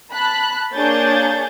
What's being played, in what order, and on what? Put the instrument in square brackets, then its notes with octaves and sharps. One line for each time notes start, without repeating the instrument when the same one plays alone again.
[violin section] A5 B5 F#6
A#3 D4 G#4 C#5 G6 A6